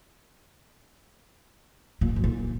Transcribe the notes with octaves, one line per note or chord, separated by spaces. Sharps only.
A#2
F2
F#2
A#2